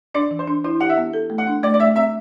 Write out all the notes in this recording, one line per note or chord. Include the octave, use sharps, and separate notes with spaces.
D4 D5
E3
C5
D4
E4 C5
G4 F#5
E5
B3
A4
A3
F#5
D4
A3 D5
D5
A3 E5
C4 E5